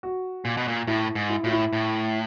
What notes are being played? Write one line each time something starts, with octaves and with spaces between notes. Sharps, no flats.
F#4
A#2
B2
A#2
A2 E4
G#2
E4
A2 F4
E4
A2